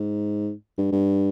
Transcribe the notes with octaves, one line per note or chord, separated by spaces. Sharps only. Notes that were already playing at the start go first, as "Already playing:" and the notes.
Already playing: G#2
G2
G2